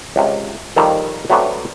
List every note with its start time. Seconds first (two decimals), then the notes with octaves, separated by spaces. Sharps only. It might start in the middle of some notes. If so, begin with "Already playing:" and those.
0.16 C#2 C3
0.76 D#2 D#3 F3 G3 A4
1.30 F#3 A3 B3 C4 D4